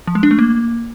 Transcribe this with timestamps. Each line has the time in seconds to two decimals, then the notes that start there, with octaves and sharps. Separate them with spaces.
0.07 F3
0.15 G#3
0.23 D4
0.31 A3
0.39 A#3